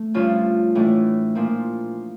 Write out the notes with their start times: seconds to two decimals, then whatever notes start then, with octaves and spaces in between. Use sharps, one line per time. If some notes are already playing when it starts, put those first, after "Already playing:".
Already playing: A3
0.14 G2 D3 F3 C#4 F4
0.75 A2 E3 A3 D4
1.35 A#2 F3 A#3